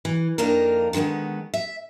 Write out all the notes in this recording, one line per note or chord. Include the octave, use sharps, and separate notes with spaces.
E3
F2 A#3 D4 D#4 A#4
D3 D#3 F#3 G#3 B3
E5